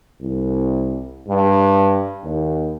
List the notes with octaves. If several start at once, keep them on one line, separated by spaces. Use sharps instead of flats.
C2
G2
D#2